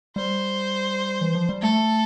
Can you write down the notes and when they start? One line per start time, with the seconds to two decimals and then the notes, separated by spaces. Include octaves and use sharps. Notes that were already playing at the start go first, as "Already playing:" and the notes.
0.16 G3 C5
1.21 E3
1.35 F3
1.49 G3
1.62 A3 A4